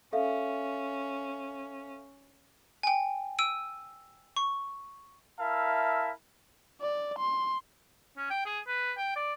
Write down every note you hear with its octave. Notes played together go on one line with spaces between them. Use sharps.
C#4 A4 E5 F5
G5 G#5
E6 D7 D#7
C#6
E4 A#4 E5 F5 A5
D5
C6
C#4
G5
G#4
B4
G5
D5